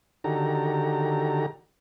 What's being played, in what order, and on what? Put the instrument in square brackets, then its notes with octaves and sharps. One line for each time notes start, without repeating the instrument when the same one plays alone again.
[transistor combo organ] D3 D#3 F#4 G4 A4 A#5